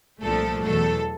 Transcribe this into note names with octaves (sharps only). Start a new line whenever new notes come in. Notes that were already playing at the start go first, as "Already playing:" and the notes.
C2 A#2 F3 A3 D4 A4
E2 B2 F#3 A3 A4